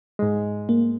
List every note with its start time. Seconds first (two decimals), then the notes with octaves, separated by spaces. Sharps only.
0.19 G#2 G#3
0.69 A#3